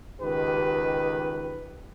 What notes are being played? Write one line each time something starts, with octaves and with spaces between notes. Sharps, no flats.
C#2 D#3 G4 B4